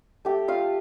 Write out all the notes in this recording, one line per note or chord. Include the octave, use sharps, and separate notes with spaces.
A3 G4 G5
F4 F5